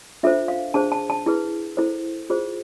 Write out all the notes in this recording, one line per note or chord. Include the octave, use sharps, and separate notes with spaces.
D4 F4 A4 C5 E5
F5
D4 G#4 C5 A5
A5
A5
E4 G#4 B4
E4 A4 C5
F4 G#4 C5